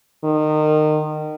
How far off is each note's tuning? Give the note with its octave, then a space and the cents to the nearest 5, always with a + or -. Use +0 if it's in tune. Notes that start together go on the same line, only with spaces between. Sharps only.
D#3 -25